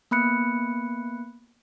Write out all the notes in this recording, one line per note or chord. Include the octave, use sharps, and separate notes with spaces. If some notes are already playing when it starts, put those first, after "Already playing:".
A#3 B3 B5 F#6 C#7